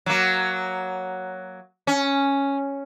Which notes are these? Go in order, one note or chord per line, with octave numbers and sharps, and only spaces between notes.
F#3 A#3
C#4